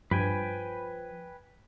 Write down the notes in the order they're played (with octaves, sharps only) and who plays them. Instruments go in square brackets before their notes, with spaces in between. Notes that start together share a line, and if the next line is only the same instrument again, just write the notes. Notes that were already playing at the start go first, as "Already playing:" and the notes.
[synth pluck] G2 [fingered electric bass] F3 [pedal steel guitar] B4 G5 G#5